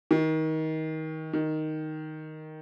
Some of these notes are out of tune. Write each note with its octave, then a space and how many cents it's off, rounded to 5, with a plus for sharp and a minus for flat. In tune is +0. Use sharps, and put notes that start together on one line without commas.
D#3 +25
D#3 +0